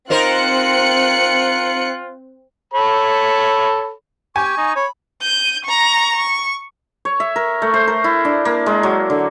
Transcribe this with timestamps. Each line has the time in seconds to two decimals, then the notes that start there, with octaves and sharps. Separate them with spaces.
0.10 C4 D#4 F4 A#4 C5 F#6 C#7
2.74 A4 C#5 B5
4.36 G4 G#5 C#6
4.58 D#4
4.76 C#5 B5
5.22 G6 D#7
5.64 A#5 C#6
6.15 C#6
7.05 C#5
7.20 E5
7.36 A#4
7.62 A3
7.74 C5
7.88 A#4
8.04 E4
8.25 D4
8.45 A#3
8.66 G#3
8.83 F#3
9.10 D3